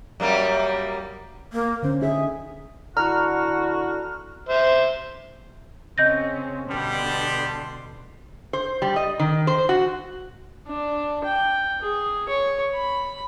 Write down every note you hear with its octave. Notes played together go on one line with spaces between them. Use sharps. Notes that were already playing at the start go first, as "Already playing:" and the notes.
F#2 G3 A#3
A#3
D3 C#4 C5
D#4 G#4 E5
D3 E4 F#4 A#5 F6
C5 E5 C6
C#3 C4 C#4 D#5 G6 A#6
B2 D3 G3 B3 A5 C6
C5
G3
D#5
D#3
C5
F#4
D4
G5
G#4
C#5
B5